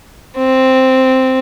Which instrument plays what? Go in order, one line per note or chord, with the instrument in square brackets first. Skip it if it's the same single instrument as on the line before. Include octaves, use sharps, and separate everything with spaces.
[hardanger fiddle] C4